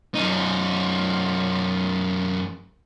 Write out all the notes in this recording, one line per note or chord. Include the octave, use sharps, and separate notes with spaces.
F#2 D#4